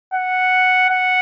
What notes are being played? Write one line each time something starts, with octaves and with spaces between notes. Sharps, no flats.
F#5
F#5